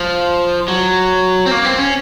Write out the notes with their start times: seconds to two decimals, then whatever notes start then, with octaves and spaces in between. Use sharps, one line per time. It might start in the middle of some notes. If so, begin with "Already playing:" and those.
Already playing: F3
0.68 F#3
1.46 C4
1.51 A#3
1.65 C4
1.78 C#4